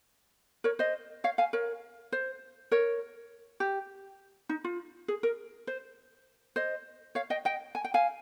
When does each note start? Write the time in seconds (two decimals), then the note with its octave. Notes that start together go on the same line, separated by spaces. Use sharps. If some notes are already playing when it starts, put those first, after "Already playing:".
0.64 A#4 C#5
0.79 C5 D#5
1.24 C#5 F5
1.38 F5 G#5
1.53 A#4 C#5
2.12 C5
2.72 A#4 C#5
3.60 G4
4.49 D#4
4.64 F4
5.08 G#4
5.23 A#4
5.67 C5
6.56 C5 D#5
7.15 C#5 F5
7.30 D#5 G5
7.45 D#5 G5
7.75 G#5
7.85 G5
7.94 F5 G#5